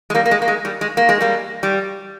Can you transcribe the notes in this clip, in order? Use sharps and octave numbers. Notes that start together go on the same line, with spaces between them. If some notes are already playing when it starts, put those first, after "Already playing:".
G#3
G3 A#3
A#3
G#3
A#3
G#3
G3
G#3
A#3
G#3
G3 A#3
G3